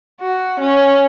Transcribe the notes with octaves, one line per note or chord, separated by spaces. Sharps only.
F#4
C#4